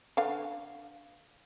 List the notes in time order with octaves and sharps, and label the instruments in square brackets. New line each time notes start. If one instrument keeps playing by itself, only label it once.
[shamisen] D3 B4 F5